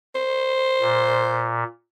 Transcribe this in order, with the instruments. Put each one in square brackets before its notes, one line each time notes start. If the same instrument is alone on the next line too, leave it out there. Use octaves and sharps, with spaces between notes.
[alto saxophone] C5
[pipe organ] A#2